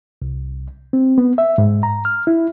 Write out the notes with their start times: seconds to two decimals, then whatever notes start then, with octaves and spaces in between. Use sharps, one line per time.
0.22 C2
0.93 C4
1.18 B3
1.38 E5
1.58 G#2
1.83 A#5
2.05 F6
2.27 E4